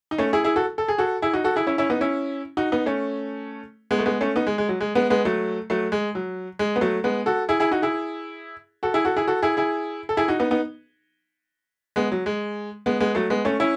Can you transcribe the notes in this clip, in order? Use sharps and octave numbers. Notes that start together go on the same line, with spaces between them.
D#4
A3 C#4
E4 G#4
E4 G#4
F#4 A4
A4
G#4
F#4 A4
E4 G#4
D#4 F#4
F#4 A4
E4 G#4
C#4 E4
C#4 E4
B3 D#4
C#4 E4
D#4 F#4
B3 D#4
A3 C#4
G#3 B3
A3
G#3 B3
A3 C#4
B3 D#4
G#3
G#3
F#3
G#3
G#3 B3
G#3 B3
F#3 A3
F#3 A3
G#3
F#3
G#3
B3
F#3 A3
G#3 B3
F#4 A4
E4 G#4
E4 G#4
D#4 F#4
E4 G#4
F#4 A4
E4 G#4
F#4 A4
E4 G#4
F#4 A4
E4 G#4
E4 G#4
A4
E4 G#4
D#4 F#4
B3 D#4
B3 D#4
G#3 B3
F#3
G#3
G#3 B3
G#3 B3
F#3 A3
G#3 B3
A3 C#4
C#4 E4